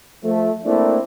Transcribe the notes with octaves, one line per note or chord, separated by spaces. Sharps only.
F3 A3
A3 A#3 C4 D4 E4